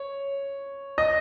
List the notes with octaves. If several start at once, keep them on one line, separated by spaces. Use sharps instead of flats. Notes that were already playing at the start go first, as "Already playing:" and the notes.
Already playing: C#5
D#5